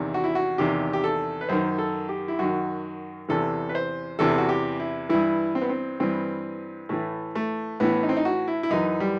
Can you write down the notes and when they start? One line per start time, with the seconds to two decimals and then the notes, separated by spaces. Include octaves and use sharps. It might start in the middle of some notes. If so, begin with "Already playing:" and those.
Already playing: E2 C3 D#3
0.14 F#4
0.24 E4
0.35 F#4
0.58 E2 C3 D#3 G4
0.93 G4
1.04 A4
1.41 B4
1.49 F#2 D#3 C5
1.78 A4
2.09 G4
2.28 E4
2.39 F#2 D#3 F#4
3.29 E2 C3 E3 A4
3.69 B4
3.75 C5
4.19 E2 C3 E3 A4
4.38 F#4
4.49 G4
4.80 E4
5.09 G2 E3 E4
5.55 C4
5.62 B3
5.69 C4
6.00 G2 E3 C4
6.89 A2 E3 A3
7.35 A3
7.80 A2 E3 B3
8.03 D#4
8.09 C4
8.17 D#4
8.25 F#4
8.48 E4
8.63 E4
8.70 F#2 E3 D#4
9.00 G3